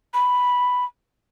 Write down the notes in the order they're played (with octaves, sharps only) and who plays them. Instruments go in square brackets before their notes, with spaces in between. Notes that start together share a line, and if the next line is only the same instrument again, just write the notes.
[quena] B5